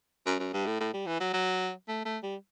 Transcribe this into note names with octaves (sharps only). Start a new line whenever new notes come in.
F#2
F#2
G2
A2
A2
G3
E3
F#3
F#3
A3
A3
G3